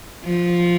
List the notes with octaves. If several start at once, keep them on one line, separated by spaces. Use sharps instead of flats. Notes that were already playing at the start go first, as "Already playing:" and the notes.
F3